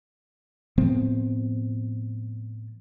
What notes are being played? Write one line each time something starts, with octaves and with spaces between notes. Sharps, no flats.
A2 F3 B3 C4